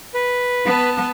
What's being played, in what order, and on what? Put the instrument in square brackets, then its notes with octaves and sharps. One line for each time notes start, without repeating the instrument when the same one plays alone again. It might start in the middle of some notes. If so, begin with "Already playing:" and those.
[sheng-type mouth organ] B4
[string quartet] B3 A5